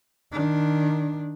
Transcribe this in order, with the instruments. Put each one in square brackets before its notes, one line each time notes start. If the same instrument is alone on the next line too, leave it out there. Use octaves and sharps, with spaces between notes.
[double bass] D#3 D4